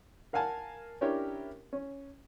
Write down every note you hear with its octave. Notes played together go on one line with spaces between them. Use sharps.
A#4 F5 F#5 G#5 A5
C#4 D4 E4 G4 A#4 C#5
C#4